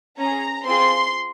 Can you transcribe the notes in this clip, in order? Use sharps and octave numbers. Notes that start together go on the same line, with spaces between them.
C#4 G#4 A#5
C4 F4 G#4 C6